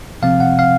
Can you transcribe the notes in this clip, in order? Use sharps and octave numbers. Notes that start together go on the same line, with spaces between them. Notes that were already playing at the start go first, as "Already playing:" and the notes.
C3 F3 C4 F5
F#5
F5